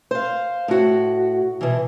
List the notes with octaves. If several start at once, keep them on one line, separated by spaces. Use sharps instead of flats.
C5 F5
A2 F#4
B2 E3